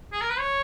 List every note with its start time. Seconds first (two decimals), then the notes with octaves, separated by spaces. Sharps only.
0.13 G#4
0.21 A#4
0.30 B4
0.39 C#5